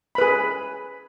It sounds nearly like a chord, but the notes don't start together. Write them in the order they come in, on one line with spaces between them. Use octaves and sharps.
B5 B4 G#4